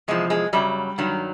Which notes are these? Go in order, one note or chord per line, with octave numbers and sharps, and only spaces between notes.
E2 C3 F3 G#3
G#3
F#2 C#3 F#3 G3
G2 D#3 F#3